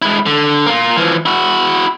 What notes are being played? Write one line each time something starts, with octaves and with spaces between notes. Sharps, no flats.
G#3 E4
D3
A#3 F4
E3 F3
E4 F#4